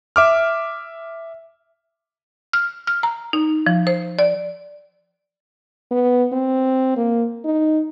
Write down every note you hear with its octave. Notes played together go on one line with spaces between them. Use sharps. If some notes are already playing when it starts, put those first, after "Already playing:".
E5 D6 F6
F6
F6
A#5
D#4
F3
C5
D5
B3
C4
A#3
D#4